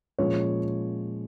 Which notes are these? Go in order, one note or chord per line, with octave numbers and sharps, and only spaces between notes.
A#2 F3 G#3 C#4 C#5